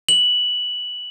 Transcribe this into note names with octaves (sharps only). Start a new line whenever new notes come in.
F#7